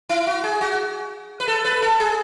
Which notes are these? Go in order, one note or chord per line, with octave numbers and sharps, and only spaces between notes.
E4
F#4
G#4
F#4
B4
A4
B4
A4
G#4